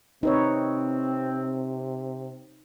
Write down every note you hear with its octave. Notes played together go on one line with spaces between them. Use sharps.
C3 C4 D#4 B4 C#5